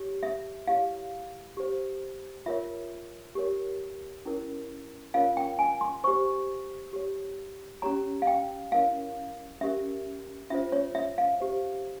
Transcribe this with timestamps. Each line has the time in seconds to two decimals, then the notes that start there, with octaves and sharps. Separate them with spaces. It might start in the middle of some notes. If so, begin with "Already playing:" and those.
Already playing: G4 C#5
0.23 E5
0.67 E4 G4 C#5 F5
1.57 G4 C5
2.46 F4 A#4 C#5 E5
3.35 G4 A#4 C#5
4.25 C#4 E4 A#4 C#5
5.14 C#4 F4 A#4 C#5 F5
5.37 G5
5.59 G#5
5.81 C6
6.04 G4 C5 C#6
6.93 G4 C#5
7.82 C#4 G4 C#5 A#5
8.22 F5
8.27 G5
8.72 C#4 E4 A#4 C#5 F5
9.61 C#4 G4 A#4 E5
10.50 C#4 F4 C5 E5
10.72 C#5
10.95 E5
11.18 F5
11.40 G4 C5